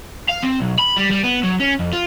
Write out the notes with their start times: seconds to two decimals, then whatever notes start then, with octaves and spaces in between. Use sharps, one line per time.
0.29 F5
0.43 C4
0.60 B1
0.79 B5
0.96 G3
1.11 G3
1.23 B3
1.44 F#3
1.60 C#4
1.79 F2
1.93 F4